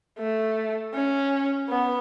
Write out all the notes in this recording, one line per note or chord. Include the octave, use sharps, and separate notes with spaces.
A3
C#4
B3